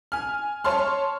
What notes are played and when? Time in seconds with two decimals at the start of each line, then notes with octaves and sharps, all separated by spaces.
0.12 G#5 F6
0.64 C#5 A5 C6 F6